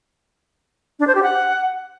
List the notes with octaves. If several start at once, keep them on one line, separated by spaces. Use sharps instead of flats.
D4
C5
G4
F#5